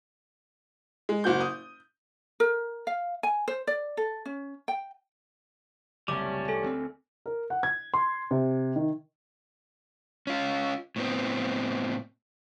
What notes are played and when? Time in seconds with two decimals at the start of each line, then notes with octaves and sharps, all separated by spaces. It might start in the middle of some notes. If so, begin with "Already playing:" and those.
1.09 G#3
1.24 F#1 F#4 G6
1.41 D#6
2.40 A#4
2.87 F5
3.23 G#5
3.48 C5
3.67 D5
3.97 A4
4.25 C#4
4.68 G5
6.08 F#1 C2 G3 A3 C#4 D6
6.48 C2 A4 G#5
6.62 D2 F#3 C4
7.26 A#4
7.50 F#5
7.63 G#6
7.94 C6
8.31 C3
8.76 D#3
10.27 C#4 F4
10.96 A2 B3 C4